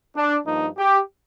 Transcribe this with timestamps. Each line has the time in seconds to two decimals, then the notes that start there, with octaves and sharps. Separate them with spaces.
0.16 D4
0.46 G2 F3 A#3 D#4
0.77 G4